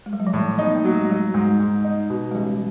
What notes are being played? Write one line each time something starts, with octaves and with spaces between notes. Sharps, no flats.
G#3
G3
F#3
F3
A2 E3
B3 D#4
A#3
F#3 A3
G#3
F#3 G3
G#2 G#3
G#2
D#4
B2
G#3
A1 G3